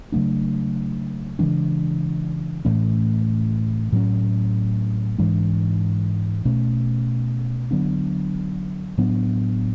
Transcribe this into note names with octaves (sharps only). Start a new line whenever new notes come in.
C#3 F#3 A3 D4
C#3 E3 G#3 D4
A2 E3 A3 C#4
A2 F#3 C#4
G#2 E3 G#3 D4
B2 A3 C#4
D3 F#3 B3 D4
A2 F#3 B3 D4